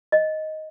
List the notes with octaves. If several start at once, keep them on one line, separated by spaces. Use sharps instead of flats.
D#5